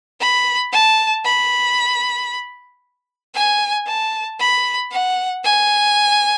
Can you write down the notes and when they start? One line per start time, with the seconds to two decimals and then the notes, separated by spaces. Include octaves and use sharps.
0.20 B5
0.72 A5
1.25 B5
3.34 G#5
3.87 A5
4.39 B5
4.91 F#5
5.44 G#5